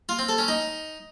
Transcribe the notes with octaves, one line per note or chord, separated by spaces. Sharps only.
F4
C4
A4
C#4
D#4